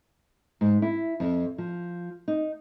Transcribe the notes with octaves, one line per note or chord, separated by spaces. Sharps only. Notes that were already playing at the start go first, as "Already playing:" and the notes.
G#2
E4
F2
F3
D#4